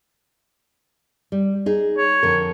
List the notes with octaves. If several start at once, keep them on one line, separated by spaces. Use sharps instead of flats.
G3
D#4 G#4
C#5
F2 D3 A#4